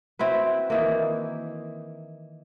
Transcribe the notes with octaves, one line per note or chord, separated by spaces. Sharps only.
C4 E4 F#4 B4
D#3 E3 A#3